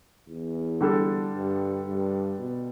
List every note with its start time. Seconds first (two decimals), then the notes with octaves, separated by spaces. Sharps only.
0.28 E2
0.81 D3 G3 D4 A4
1.33 G2
1.86 G2
2.39 B2